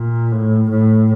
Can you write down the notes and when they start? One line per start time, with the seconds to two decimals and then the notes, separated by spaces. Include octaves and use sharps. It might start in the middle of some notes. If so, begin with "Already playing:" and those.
Already playing: A#2
0.32 A2
0.71 A2